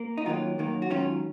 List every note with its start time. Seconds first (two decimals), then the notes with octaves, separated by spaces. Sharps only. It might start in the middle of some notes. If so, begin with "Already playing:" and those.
Already playing: A#3
0.17 D#4
0.25 F#2 D#3 F#3 A#3 F4
0.58 F#2 D#3 F#3 A#3
0.82 F#4
0.90 G#2 D#3 F#3 C#4 F4